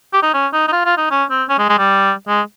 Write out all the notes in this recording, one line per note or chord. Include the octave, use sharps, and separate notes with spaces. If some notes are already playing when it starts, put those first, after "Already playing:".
G4
D#4
C#4
D#4
D#4
F4
F4
D#4
C#4
C4
C#4
G#3
G#3
G3
G#3